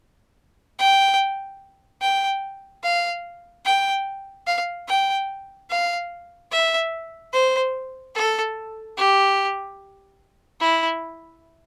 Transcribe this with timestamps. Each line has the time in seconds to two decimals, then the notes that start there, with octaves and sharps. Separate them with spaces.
0.79 G5
2.01 G5
2.84 F5
3.65 G5
4.47 F5
4.88 G5
5.70 F5
6.52 E5
7.33 C5
8.15 A4
8.97 G4
10.60 E4